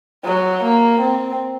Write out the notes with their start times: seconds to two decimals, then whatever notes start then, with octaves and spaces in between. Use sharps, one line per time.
0.24 F#3
0.63 A#3
1.00 C4